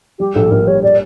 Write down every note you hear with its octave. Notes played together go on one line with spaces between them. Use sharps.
G3 G4
A#1 A4
A#1 A#4
G3 C#5
G4 D5